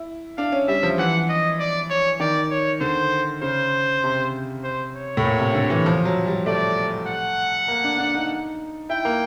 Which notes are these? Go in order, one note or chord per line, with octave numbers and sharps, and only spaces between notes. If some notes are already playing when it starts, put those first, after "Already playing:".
Already playing: E4
D4 F5
C#4
G3 E5
F3
E3 F#5
D#5
D5
C#5
D#3 D5
C#5
D3 C5
C#3 C5
C3
C5
C#5
A2
A#2
C3
D3
E3
F3
F#3
G3
A3 D5
F#5
A#3
D4
D4
D#4
E4 G5
A#3